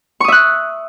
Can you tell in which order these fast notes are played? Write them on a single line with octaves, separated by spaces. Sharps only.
C#6 D#6 E5 F#6